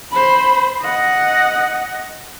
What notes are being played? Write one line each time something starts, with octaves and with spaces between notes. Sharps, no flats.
C5 B5
D#5 F#5